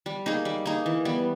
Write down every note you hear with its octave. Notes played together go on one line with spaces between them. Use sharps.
G3
A#3 D#4 G#4
G3
A#3 D#4 G#4
E3
G3 B3